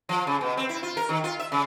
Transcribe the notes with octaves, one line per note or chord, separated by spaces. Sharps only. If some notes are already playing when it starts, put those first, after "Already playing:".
F3
C#3
B2
C4
E4
F4
A#4
D#3
F4
E5
C#3